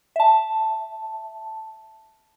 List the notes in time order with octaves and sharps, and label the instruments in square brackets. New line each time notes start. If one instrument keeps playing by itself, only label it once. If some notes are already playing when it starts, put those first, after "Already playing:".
[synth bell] E5 A5